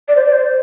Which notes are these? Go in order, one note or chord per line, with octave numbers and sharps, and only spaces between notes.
D5
C5
D5
C5